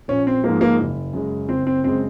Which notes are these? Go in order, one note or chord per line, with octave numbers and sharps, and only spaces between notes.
A#1 C#4
C4
G#2 F3 G#3 A#3
A#3
F#1
F#2 C#3 G#3
F#1 C4
C4
F#2 C#3 G#3 C4